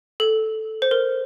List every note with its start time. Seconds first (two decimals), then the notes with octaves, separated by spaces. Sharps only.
0.20 A4
0.82 C5
0.91 A#4